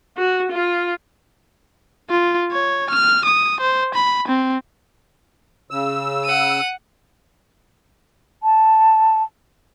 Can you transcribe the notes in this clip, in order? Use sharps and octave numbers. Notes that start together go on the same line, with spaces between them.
F#4
F4
F4
C#5
F6
D#6
C5
B5
C4
C#3 E6
F#5 D#7
A5